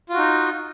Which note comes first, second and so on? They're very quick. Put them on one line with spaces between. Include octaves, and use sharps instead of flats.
F4 F#4 D#4